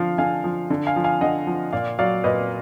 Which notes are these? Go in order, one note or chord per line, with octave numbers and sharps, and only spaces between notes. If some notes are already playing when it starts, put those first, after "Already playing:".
Already playing: D3 F3 F5
D3 F5 G#5
F3
D3
F5 G#5
F3
F5 G#5
D3 D#5 F#5
F3
A#2 D5 F5
F#3 D5 F5
A#2 B4 D#5